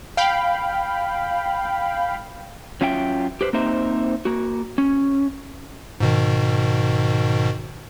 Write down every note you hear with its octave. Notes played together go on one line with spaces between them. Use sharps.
F5 G5 B5
F#3 C#4 F4 E5 G5
G4 B4 C5
A#3 C4 D#4 C5 E5
A#3 F#4
C#4
G#2 B2 D#3